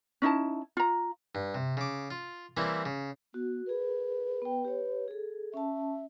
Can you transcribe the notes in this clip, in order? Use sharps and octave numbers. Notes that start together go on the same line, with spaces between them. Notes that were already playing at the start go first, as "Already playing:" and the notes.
C#4 D#4 E4 A5
F4 A#5
G2
C3
C#3 D6
F4
E3 G3 A#3 C4 E4
C#3
B3 F#4
G#4 A#4 B4
B3 G5
G4 C#5
G#4 A4
C#4 E5 A5